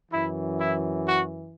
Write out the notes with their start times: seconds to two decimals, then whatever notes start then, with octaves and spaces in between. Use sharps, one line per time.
0.11 F#2 E3 E4
0.59 E4
1.06 F#4